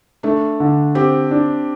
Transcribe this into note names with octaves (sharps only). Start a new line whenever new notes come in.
A3 D4
D3
C4 G4
D4